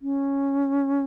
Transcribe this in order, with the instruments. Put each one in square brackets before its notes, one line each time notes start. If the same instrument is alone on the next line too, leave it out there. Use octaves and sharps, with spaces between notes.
[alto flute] C#4